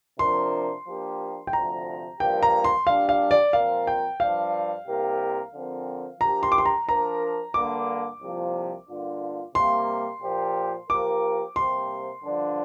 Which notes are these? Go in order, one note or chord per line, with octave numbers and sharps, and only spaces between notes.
C3 F3 D4 A#4 C6
F3 A#3 D4 G4 A#4
G5
D2 C3 F3 A#5
G2 F3 A#3 G4 A#4 G5
A#5
C6
A#2 G3 D4 F5
F5
D5
A#2 F3 C4 A#4 F5
G5
G2 F3 D4 F5
C2 C3 A#3 G4 A#4
D3 F3 C4 A#4
F3 D4 G4 A#4 A#5
C6
D6
C6
A#5
F3 D4 A#4 A#5
G2 D3 A#3 D6
C2 C3 F3 A#3
G2 D3 A#3 D4 F4
C3 G3 A#3 C6
A#2 F3 A#3 G4 C5
F3 A#3 G4 A#4 D6
C3 G3 A#3 G4 C5 C6
G2 D3 F3 D4